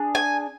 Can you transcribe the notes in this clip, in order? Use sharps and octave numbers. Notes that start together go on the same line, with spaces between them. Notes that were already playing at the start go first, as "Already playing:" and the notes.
Already playing: D4 G#4
G#5